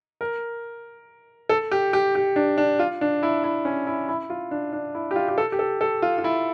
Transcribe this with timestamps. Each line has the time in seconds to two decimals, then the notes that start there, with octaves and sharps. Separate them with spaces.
0.21 A#4
1.49 A4
1.71 G4
1.93 G4
2.15 G4
2.36 D4
2.58 D4
2.79 F4
3.01 D4
3.23 E4
3.44 E4
3.65 C#4
3.87 E4
4.09 E4
4.30 F4
4.51 D4
4.73 D4
4.95 E4
5.11 G4
5.16 F4
5.29 G4
5.38 A4
5.52 G4
5.59 A4
5.81 A4
6.02 F4
6.18 F4
6.24 E4